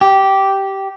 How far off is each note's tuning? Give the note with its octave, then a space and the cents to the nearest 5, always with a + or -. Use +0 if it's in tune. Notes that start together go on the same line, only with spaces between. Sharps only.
G4 -10